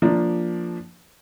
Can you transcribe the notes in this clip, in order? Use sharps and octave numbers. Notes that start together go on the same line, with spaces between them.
F3 A#3 D4